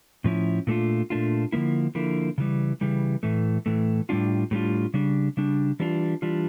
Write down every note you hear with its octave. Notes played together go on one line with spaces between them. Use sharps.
A2 F3 C#4 E4
A#2 A3 D4 F4
A#2 A3 D4 F4
D3 F3 A#3 E4
D3 F3 A#3 E4
C#3 E3 G3
C#3 E3 G3
A2 E3 A3
A2 E3 A3
A2 G3 D4 F4
A2 G3 D4 F4
C#3 G3 D4
C#3 G3 D4
E3 G3 D4 F4
E3 G3 D4 F4